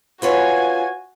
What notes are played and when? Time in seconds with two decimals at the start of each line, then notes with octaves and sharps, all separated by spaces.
0.22 F4 F#4 B4 C#5 G#5